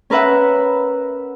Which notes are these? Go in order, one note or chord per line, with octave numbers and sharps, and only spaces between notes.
C#4 A#4 B4 E5 F#5